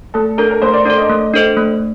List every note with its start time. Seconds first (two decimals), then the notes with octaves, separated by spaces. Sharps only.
0.14 A3 A4
0.38 D4 A4 A#4
0.51 A#4
0.62 A3 C5
0.73 D5
0.85 D4 D5
0.90 A4
0.98 D#5
1.10 A3
1.34 D4 A4 C5 D#5
1.57 A3